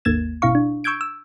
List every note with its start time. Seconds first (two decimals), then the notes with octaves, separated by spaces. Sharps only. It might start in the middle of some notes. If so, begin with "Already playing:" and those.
0.05 G#1 D#2 A#3 G#6 A6 E7
0.42 G1 B2 E4 F5 C#6
0.55 D4
0.84 C#6 E6 G6 G#6 D7
1.01 E6